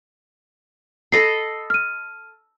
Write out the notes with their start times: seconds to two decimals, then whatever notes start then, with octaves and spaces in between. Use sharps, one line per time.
1.12 A4 D#5 B5 C7
1.70 F6 D#7